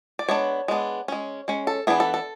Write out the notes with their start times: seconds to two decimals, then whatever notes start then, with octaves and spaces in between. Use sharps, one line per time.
0.19 D5
0.28 G#3 B3 D4 C#5
0.68 G#3 B3 D4
1.08 G#3 C#4
1.48 G#3 C#4
1.67 A4
1.87 E3 B3 D4 G#4
2.00 A4
2.14 A4